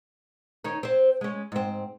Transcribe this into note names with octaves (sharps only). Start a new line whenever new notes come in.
D#3 C#4 D#4
C4 C5
G#3 C#4
G#2 C4